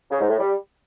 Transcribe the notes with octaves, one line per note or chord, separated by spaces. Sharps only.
C#3
G#2
A2
G3